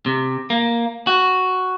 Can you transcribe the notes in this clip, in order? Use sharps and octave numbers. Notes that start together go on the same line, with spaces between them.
C3
A#3
F#4